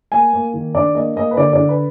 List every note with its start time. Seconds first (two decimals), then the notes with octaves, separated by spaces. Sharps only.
0.12 A#3 G#5
0.33 A#3
0.54 D#3
0.75 D4 D5
0.95 A#3 D#5
1.16 A#3 D#5
1.31 B4
1.37 D3 D5
1.53 D3 D5
1.69 B4